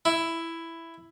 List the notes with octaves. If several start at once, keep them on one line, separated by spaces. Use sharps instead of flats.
E4